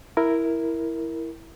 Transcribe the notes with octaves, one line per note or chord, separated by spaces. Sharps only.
E4 A#4